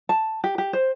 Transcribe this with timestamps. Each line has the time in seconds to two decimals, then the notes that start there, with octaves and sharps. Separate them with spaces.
0.09 A5
0.44 G4
0.58 G4
0.73 C5